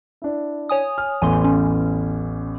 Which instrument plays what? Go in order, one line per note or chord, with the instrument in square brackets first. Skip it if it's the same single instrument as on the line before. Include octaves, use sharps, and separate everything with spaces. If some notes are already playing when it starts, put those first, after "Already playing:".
[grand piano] D4 E4
[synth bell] C#5 G#5 D#6
[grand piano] F6
[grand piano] A1 E2 A2 [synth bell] G#5 C6
[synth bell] C#4